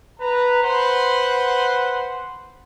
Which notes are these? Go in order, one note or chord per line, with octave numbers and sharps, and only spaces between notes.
B4 A#5
B4 C5 F#5 C6